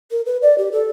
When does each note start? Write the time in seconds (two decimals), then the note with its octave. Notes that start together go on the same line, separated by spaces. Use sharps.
0.11 A#4
0.26 B4
0.42 D5
0.58 G4
0.72 A4